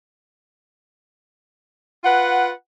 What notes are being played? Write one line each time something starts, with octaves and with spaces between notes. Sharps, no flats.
F4 B4 F#5